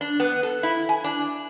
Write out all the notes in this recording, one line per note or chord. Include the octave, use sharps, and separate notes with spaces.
D4
B3
A4
E4
G#5
D4